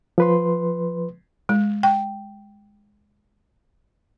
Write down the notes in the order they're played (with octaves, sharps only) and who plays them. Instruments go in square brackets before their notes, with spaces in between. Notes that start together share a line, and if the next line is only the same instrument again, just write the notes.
[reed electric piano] F3 B4 C6
[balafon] G#3
G5